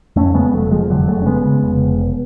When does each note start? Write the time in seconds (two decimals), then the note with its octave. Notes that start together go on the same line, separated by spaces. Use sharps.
0.16 F2 A3 C#4
0.34 C#3 G#3 B3
0.53 F1 F#3 A3
0.71 F1 F3 G#3
0.90 F1 D3 F#3
1.08 F1 F#3 A3
1.22 C#4
1.26 C#3 G#3 B3
1.45 C#3
1.64 F1
1.82 F1